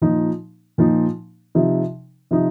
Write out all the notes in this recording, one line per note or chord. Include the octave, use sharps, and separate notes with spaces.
A#2 F3 D#4
A#2 F3 D#4
C3 F3 D#4
C3 F3 D#4